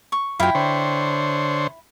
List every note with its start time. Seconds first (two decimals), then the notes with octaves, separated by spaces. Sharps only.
0.12 C#6
0.40 F#2 E4 F4 G5
0.55 D3 C5 C#5